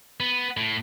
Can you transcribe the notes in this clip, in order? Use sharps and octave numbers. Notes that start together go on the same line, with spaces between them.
B3
A2